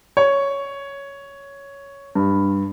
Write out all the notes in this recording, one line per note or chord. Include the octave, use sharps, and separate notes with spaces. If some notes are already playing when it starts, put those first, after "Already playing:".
C#5
G2